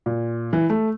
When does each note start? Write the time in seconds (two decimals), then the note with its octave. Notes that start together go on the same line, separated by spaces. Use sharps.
0.06 A#2
0.53 E3
0.70 A3